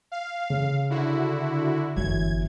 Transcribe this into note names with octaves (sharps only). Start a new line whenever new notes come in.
F5
C#3
D3 E4 F#4
G1 F#2 E3 G#6